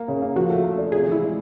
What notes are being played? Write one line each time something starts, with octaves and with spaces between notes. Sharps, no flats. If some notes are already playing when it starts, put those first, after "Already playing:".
Already playing: A#3
C#3
A#3
F3 F#4
A3
A3
D4
C3 G#4
E3
E4
G#3